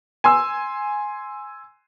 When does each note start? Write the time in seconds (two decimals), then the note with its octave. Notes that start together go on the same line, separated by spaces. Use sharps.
0.24 G#5 C6 E6